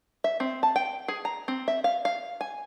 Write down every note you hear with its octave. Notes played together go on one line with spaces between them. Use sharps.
E5
C4
A5
G5
G#4
A#5
C4
E5
F5
F5
G#5